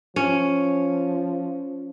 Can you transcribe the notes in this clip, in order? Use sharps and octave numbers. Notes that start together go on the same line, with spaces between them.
F3 C#4